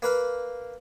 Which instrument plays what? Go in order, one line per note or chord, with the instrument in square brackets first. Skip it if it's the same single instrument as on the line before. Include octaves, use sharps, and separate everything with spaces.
[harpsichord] A#3 B4 F5